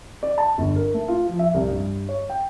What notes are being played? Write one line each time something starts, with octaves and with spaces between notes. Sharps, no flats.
D5
A5
G1
A#4
A3
F4
F3
E5
C2
G2
C#5
G5